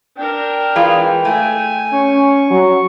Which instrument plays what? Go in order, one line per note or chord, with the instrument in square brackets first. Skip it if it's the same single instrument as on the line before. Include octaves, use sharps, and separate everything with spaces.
[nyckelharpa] D4 A#4 [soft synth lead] G5
[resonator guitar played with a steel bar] E3 G#3 F4
[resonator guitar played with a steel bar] A3 [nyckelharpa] G#5
[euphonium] C#4 [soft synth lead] C#6
[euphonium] F#3